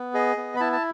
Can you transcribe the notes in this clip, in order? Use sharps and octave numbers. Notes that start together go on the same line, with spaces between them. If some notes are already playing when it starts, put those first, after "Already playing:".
Already playing: B3
G#4 D#5
B3
B5
E4 A5
A5